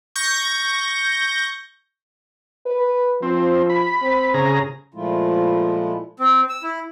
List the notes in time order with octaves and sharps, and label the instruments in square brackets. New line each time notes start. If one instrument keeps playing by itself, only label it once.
[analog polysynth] C#6 G6 A#6
[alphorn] B4
[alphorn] F3 [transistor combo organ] C4
[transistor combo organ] B5
[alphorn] C4
[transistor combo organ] C#3 G#4 A#5
[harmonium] A#2 F3 G#3 A3 E4 F4
[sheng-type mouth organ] C4
E6
E4